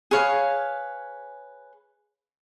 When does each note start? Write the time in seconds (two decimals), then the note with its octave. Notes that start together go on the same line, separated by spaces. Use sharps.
0.11 G#4 B4 C#5 F5